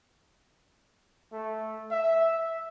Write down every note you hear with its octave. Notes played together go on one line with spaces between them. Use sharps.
A3
E5